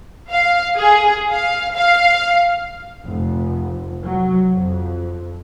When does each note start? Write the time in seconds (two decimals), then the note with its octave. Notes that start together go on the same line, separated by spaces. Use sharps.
0.29 F5
0.77 G#4
1.31 F5
1.72 F5
3.06 F1
4.04 F#3
4.53 F2